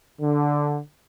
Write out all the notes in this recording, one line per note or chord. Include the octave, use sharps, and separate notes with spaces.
D3